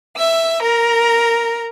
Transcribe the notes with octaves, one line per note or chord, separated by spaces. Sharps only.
E5 E6
A#4 A#5